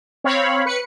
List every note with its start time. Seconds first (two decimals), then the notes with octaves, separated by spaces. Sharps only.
0.24 C4 C#5 F5 B5
0.66 B4 C#7